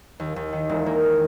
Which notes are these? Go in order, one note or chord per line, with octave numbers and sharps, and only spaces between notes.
D#2
D#2
D#3
E1
A#3